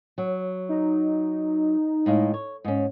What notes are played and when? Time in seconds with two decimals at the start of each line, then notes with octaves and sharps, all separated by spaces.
0.18 F#3
0.69 D#4
2.06 A2 G#3 F5
2.34 C#5
2.64 G#2 C#4